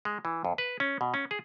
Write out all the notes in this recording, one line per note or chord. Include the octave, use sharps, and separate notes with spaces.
G#3
E3
F2
B4
C#4
B2
C#4
G#4